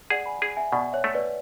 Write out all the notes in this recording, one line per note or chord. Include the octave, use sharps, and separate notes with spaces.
G#4 D5 F#5
G#5 B5
G#4
E5 G#5
B2 D5 F#5
C#5 E5
A3
B4 D5